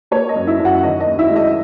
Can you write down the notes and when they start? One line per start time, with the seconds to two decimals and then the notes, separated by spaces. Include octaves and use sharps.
0.11 A#3 C#5
0.29 D#5
0.36 F#2
0.47 E4 E5
0.60 F#2
0.65 F#4 F#5
0.83 D#3 D#5
1.00 D#5
1.07 D#2
1.19 E4 E5
1.30 G#3
1.36 D#5